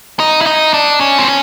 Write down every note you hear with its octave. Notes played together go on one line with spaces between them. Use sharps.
D#4
E4
D#4
D4
C#4
C4
C#4